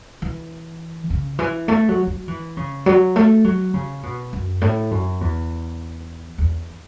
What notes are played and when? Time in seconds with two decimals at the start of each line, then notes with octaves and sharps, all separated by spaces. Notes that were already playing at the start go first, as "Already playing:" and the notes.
0.22 E3
1.10 C#3
1.39 E3
1.68 A3
1.88 F#3
2.07 F#3
2.28 E3
2.57 C#3
2.86 F#3
3.16 A3
3.44 F#3
3.74 C#3
4.03 B2
4.33 F#2
4.61 A2
4.91 F#2
5.21 E2
6.38 E2